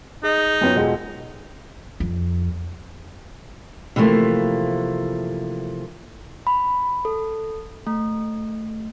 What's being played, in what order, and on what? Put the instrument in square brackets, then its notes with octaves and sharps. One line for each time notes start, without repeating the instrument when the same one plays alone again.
[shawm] D#4 [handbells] G#4 D#5
[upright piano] F#2 B3 C#4 [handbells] F4 C5 G5
[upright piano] E1 G#3 [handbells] A4 D#5 F#5
[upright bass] F2
[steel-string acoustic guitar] C3 E3 F3 A3 A#3
[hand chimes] B5
A4
A3